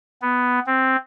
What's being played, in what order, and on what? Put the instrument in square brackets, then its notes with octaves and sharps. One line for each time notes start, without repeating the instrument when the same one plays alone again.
[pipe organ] B3
C4